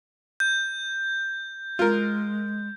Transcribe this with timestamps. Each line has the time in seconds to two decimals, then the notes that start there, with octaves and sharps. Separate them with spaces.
0.40 G6
1.79 G#3 F4 A#4